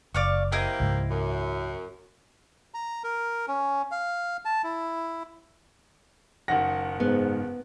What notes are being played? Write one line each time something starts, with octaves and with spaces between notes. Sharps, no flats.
F#1 D5 F5 C#6
A#3 C4 E4 G4 D#5
C#2 G#2
F#2
A#5
A#4
C#4
F5
A5
E4
F#1 D#3 F#5 A#6
G#2 B3